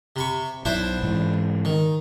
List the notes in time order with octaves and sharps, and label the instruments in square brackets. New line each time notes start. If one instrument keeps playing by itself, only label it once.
[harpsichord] C3 B5 C#6
[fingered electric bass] B1 [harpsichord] D4 E4 C5
[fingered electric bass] G#2 E3
[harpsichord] D#3